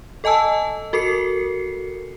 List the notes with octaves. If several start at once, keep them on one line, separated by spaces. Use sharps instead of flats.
A4 D#5 G#5 A5 E6
F#4 A4 A#4 C7 C#7